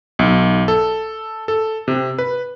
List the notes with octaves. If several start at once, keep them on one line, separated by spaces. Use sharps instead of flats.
B1
A4
A4
C3
B4